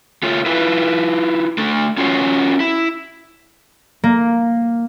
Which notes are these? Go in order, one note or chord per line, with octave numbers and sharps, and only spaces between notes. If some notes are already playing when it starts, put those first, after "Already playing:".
A3 F4 C#5
E4 F4 B4
A3 D4 A4
C#4 F4 F#4 C5 C#5
E4
A#3